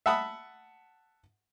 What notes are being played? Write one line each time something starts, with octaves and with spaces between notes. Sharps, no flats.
E5 F#5 A5 B5 D#6